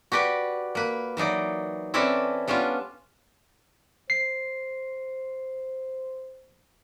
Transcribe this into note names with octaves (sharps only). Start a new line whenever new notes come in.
F#4 G4 B4 D5 G5
A#3 B4
E3 F#3 D#4 D5
C4 C#4 E4 A4 B4 D5
G3 B3 C#4 D4 F4
C5 C7